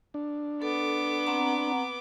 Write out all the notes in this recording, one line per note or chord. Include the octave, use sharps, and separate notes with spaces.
D4
B3 A4 D6
C4 F#5 A#5